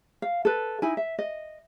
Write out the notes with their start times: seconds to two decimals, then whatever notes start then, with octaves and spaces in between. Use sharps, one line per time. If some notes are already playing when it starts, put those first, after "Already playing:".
0.22 F5
0.45 A4 B4
0.82 D#4 E4 G#5
0.97 E5
1.19 D#5